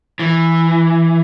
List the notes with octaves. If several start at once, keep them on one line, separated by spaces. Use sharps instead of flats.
E3